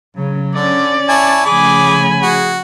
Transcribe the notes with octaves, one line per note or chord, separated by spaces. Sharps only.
C#3 F#3
D3 C#4 D5
E4 C#5 G#5 A5
C#3 F3 A3 G#4 G#5 B5 D6
F#4 G#4